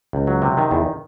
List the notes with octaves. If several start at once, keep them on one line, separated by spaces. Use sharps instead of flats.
C#2
F#3
C3
D#3
E2